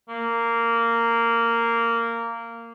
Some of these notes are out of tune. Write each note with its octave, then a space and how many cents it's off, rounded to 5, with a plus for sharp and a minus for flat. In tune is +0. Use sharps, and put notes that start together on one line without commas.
A#3 -10